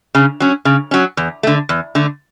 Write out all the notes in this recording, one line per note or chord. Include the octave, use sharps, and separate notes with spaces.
C#3
F#3 C#4
C#3
F#3 C#4
E2
D3 A3
E2
D3 A3